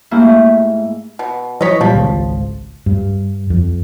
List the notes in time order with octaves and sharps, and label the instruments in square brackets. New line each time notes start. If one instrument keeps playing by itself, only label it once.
[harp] G#2 A3 A#3 D4 E4 G4
[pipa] B2
[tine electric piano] E3 F#3 B6 [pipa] C#5 D#5
[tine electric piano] A#2 G3 [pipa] F3
[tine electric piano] G#1 C#2
[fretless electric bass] G2
F2